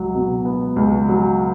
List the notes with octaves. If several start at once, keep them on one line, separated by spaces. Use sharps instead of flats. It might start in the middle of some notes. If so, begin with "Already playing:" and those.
Already playing: C#2 F#3
B2
B3
C#2
F#3